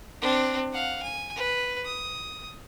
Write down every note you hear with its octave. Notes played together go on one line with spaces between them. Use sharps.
C4 D4
F5 F#5
G#5
B4
D#6